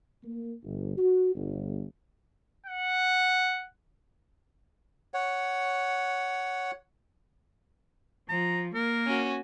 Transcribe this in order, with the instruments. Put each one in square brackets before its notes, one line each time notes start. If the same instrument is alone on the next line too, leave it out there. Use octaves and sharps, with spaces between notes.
[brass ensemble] A#3
G1
F#4
G1
[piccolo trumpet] F#5
[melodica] C#5 F#5
[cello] F3 [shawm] A#5
[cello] A#3 [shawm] A#4
[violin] C#4 F#4